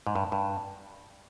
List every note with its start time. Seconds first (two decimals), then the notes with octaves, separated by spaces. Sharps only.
0.07 G#2
0.15 G2
0.32 G2